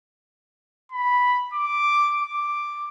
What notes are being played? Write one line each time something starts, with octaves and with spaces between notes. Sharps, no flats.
B5
D6
D6